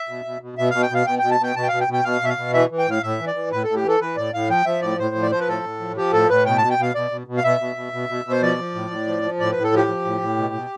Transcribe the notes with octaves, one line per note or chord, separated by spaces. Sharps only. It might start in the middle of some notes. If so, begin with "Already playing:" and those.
Already playing: E5
B2
B2
B2
B2 E5
B2 F5
G5
B2 F5
B2 G5
B2 G5
A5
B2 G5
B2 A5
G5
B2 F5
G5
B2
G5
B2 F5
B2 E5
F5
B2
E3 E5
E3
G5
A2 F5
A2 E5
E3
D5
E3
A2 B4
A2 A4
G4
E3 A4
E3 B4
A2 D5
A2 F5
F3 G5
F3 E5
A2 D5
A2 C5
F3
D5
F3 C5
B4
A2 A4
A2
F3
F3 G4
A2 A4
A2 B4
B2 G5
B2 A5
G5
B2 F5
B2 D5
B2
B2
F5
B2 E5
B2
B2
B2
B2
B2
C5
F3 D5
F3
A2
A2
F3
F3
A2 D5
A2 B4
A4
F3 G4
F3
A2
A2
B2
B2